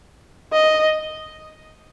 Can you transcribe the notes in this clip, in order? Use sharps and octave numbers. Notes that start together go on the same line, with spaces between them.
D#5